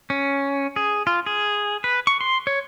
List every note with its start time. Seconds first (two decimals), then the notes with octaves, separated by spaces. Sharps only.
0.10 C#4
0.76 G#4
1.07 F4
1.26 G#4
1.84 B4
2.07 C#6
2.21 C6
2.47 C#5